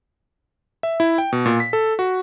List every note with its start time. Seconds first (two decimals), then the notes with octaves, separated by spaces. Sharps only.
0.83 E5
1.00 E4
1.18 G5
1.33 B2
1.46 A#2
1.60 B6
1.73 A4
1.99 F#4